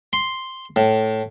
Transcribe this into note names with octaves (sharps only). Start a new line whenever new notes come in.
C6
A2